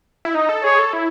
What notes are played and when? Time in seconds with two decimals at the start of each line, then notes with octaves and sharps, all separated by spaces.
0.25 E4
0.34 D#4 D#5
0.49 A4
0.63 G#4 C#5
0.79 A4
0.93 E4